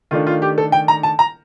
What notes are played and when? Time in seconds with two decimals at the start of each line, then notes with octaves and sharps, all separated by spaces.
0.11 D#3 A3 D4 F4
0.27 F4
0.42 G4
0.58 A4
0.72 G5
0.88 A#5
1.03 A5
1.19 A#5